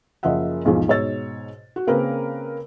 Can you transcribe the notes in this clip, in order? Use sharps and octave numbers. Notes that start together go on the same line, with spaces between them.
F#1 F3 D#5 E5 F#5
B1 E2 G#2 F3
G#2 B2 C#5 D#5 E6 A6
F#4
C#3 A#3 C4 A#4 B4